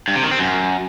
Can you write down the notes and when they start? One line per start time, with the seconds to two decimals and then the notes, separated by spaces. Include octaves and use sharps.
0.08 G2
0.16 C3
0.24 D#3
0.31 C4
0.39 F#2